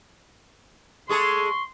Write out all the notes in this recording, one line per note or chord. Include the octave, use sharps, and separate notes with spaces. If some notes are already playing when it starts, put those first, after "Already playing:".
G#3 G#4 A4 C6 C#6